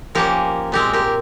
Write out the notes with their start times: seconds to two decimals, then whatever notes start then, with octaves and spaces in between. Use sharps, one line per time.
0.15 F3 A#3 C#4 G4 A#4
0.72 A#2 G#3 C4 G4 A#4
0.93 G4 A#4